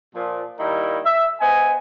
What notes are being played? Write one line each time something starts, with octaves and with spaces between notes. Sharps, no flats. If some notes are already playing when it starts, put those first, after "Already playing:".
A#2 F3
D#3 G3 A#3 E4 A#4
E5
B3 C5 D#5 G#5